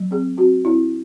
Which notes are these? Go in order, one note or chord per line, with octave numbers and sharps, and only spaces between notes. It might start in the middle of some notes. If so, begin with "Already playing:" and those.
Already playing: F#3
C4 G#4
C4 F#4
C4 E4